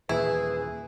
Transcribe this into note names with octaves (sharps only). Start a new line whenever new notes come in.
D#2 A#2 E3 E4 G#4 B4